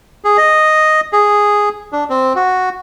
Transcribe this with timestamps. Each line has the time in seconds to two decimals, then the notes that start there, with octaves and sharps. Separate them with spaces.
0.24 G#4
0.38 D#5
1.13 G#4
1.93 D4
2.10 C4
2.36 F#4